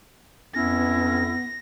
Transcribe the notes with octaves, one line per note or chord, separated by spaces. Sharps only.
F2 B3 C#4 E4 A#6